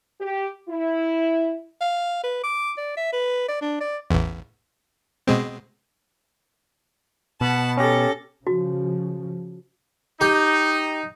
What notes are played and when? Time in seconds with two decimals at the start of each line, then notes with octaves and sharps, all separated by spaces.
0.21 G4
0.69 E4
1.81 F5
2.24 B4
2.43 D6
2.78 D5
2.97 E5
3.13 B4
3.48 D5
3.61 D4
3.80 D5
4.11 A1 E2
5.27 B2 G#3 C4
7.41 B2 F#5 A5 B5
7.77 C#4 G4 A4 A#6
8.47 C#3 F3 F#4
10.21 D#4 G4